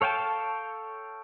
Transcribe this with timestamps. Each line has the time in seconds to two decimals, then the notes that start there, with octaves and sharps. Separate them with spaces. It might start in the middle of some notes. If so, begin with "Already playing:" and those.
0.01 A4 C#5 F5 G5 A5